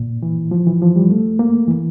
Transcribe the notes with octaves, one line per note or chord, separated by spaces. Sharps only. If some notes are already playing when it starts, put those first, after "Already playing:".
Already playing: A#2
E3
F3
E3
F3
G3
A3
A#3
E3